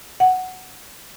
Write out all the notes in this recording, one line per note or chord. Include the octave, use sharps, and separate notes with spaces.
F#5